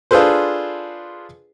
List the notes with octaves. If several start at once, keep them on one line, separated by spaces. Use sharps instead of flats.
D4 F4 G#4 A4 B4 C5